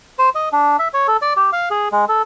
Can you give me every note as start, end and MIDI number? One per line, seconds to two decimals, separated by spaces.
0.19 0.29 72
0.35 0.49 75
0.53 0.77 62
0.79 0.88 76
0.94 1.07 73
1.08 1.17 69
1.22 1.33 74
1.36 1.50 67
1.53 1.69 77
1.70 1.88 68
1.92 2.05 56
2.09 2.22 69